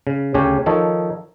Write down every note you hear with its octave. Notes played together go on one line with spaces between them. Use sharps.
C#3
D2 C#3 G4 C#5 G#5
D#3 F3 D#4 A4 C#5